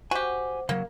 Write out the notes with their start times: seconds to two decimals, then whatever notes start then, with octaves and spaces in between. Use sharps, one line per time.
0.11 F#4 G4 C5 F#5 G#5
0.69 C#3 F#3 A#3